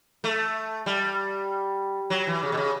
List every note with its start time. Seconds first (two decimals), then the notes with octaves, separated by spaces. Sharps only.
0.24 A3
0.86 G3
2.10 F#3
2.27 E3
2.43 C#3
2.52 B2
2.57 C#3